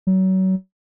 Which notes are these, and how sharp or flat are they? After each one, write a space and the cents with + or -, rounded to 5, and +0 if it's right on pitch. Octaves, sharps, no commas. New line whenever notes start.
F#3 +30